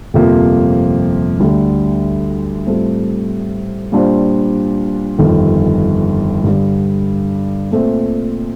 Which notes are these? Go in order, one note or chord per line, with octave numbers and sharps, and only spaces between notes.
G1 F2 C3 F3 A#3
D2 D3 G3
A2 G3 C4 F4 A4
A#2 G3 D4 F4 C5
G1 F2 D#3
G2 D3 G3
A#2 A3 C4